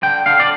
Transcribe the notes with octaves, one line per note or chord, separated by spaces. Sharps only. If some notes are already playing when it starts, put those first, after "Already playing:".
D3 G5
D3 F5
D5